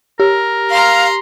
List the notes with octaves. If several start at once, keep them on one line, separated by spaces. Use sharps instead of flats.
G4 A#4
F5 A#5 C6